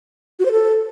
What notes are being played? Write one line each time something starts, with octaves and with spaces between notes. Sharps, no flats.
F#4
C5
A4